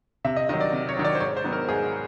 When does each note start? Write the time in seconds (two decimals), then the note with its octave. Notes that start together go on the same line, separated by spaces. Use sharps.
0.24 C3 E5
0.36 D#5
0.49 D#3 F#3 D#5
0.61 D5
0.73 C3
0.89 C#5
0.97 D#3 F#3
1.04 D5
1.15 C5
1.20 G#2 C#5
1.37 C5
1.44 D#3 F#3 B3
1.53 A#4
1.69 G#2 G#4